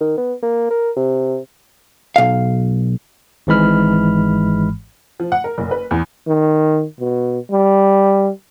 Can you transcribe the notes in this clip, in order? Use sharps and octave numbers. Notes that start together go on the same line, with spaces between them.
D#3
B3
A#3
A#4
C3
B1 F5
G#1 G#2 E3 G#3 B5 F6
F3
F#5
A#4
F#1
B4
E2
D#3
B2
G3